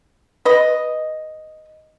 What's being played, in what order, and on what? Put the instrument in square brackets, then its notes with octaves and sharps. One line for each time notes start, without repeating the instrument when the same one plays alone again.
[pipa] B4 D#5